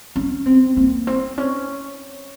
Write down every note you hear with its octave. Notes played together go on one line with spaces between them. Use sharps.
C#4
C4
A#3
C4
C#4